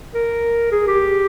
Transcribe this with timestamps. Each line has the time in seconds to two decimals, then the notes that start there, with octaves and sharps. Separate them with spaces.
0.14 A#4
0.72 G#4
0.87 G4